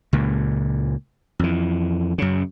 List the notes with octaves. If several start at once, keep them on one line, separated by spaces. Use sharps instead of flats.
C#2 A#2
F2 E3
F#2 C#3